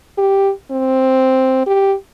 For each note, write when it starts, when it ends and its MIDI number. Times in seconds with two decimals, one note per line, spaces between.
0.18 0.51 67
0.71 1.62 60
1.66 1.94 67